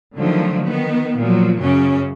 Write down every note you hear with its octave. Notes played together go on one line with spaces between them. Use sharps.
D3 D#3 F3 F#3 A3
D#3 B3
A#2 F3 F#3
F#2 C#3 F#3 C#4